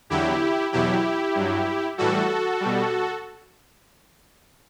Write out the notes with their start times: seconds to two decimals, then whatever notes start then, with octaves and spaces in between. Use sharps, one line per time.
0.10 E2 D3 F#3 E4 G4
0.72 E2 B2 F#3 E4 G4
1.35 G2 F#3
1.98 A2 E3 G3 F#4 A4
2.60 B2 G3